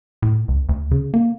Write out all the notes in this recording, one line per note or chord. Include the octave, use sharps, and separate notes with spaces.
A2
C#2
D2
C#3
A#3